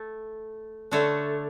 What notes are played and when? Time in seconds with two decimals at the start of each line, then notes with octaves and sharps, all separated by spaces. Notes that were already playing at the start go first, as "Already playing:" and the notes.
Already playing: A3 A4
0.91 D3 A3 D4 A4 C#5